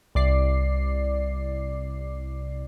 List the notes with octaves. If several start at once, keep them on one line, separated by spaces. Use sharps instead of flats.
C2 D5 C7